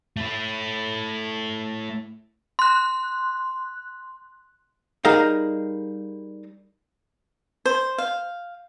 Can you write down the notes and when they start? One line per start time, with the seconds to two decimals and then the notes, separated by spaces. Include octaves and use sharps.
0.17 A3 E4
2.59 C6 F#6
5.05 G3 D#4 G#4 A#4 D#5 F5
7.65 C5
7.98 F5